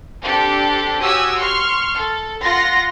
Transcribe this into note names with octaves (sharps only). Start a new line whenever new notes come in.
C4 D4 G4 A4
F#4 G4 C#5 G#5 D#6 E6
C6 C#6 F6
A4
F4 F#5 C6 A#6